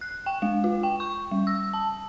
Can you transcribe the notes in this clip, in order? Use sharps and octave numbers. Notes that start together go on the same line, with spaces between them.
F#6
G5
G#3
F4
G5
C#6
G3
E6
A5